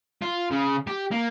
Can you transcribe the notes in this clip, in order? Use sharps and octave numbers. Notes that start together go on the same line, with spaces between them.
F4
C#3
G4
A#3